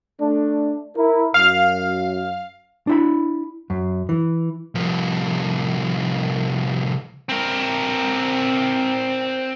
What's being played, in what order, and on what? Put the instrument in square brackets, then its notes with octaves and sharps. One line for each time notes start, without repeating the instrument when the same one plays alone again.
[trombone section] A3 D4
E4 A#4
[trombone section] F#2 [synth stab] F5 F6
[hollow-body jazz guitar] D4 E4 B5
F#2
E3
[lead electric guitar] C2 F3
[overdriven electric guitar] C4 A#4